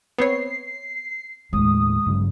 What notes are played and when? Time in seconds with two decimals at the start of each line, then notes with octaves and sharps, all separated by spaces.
0.18 B3 C4 C#5 C7
1.53 D#2 A2 G#3 D#6
2.06 G2 C#3 F#3